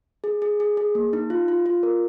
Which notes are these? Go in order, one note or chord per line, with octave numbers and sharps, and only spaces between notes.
G#4
G#4
G#4
G#4
A#3
D#4
F4
F4
F4
A#4